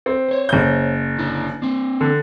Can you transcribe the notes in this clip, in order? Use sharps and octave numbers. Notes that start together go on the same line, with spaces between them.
C4
C5 C#5
F#1 G6
D3 D4 E4
C4 D4
D3